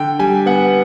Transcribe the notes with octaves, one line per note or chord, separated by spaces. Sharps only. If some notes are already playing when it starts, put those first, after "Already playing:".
Already playing: D3 G5
G3 G#5
B3 F#5